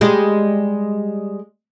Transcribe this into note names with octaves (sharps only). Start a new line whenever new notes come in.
G3 G#3